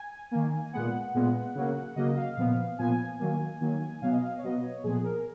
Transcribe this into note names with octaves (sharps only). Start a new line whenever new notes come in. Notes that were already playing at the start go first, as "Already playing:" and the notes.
Already playing: G#5
D#3 A#3
A#2 G#3 B3 F#5
A#2 G#3 B3
C#3 F#3 A#3
C#3 F#3 A#3 D#5
F5
A#2 F3 B3
A#2 F3 B3 G#5
D#3 F#3 A#3
D#3 F#3 A#3
B2 F#3 B3 F5
D#5
F5
C#5
B2 F#3 B3 D#5
C#5
A#2 F3 B3 G#4
A#4